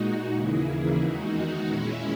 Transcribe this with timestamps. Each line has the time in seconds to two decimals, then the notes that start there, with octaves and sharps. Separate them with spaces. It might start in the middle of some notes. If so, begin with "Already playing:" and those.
Already playing: A#2 G#3 D#4 F#4
0.31 D#2 C#3 E3 A#3 E4 G#4
0.99 E2 D#3 G#3 D#4 F#4
1.66 A#2 G#3 C#4 E4